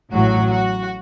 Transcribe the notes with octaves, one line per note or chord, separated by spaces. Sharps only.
A1 A2 F#3 F#4
F#4